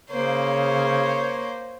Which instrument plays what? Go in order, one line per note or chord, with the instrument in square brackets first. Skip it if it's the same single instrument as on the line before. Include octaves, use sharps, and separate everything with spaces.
[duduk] C#3 [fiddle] A#3 C5 [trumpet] C#5